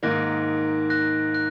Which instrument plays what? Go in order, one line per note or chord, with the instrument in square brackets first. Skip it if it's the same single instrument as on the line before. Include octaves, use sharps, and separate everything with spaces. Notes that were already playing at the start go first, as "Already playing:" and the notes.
[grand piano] G#2 D#3 A#3 [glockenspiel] F#6 A#6
[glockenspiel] F#6 A#6
F#6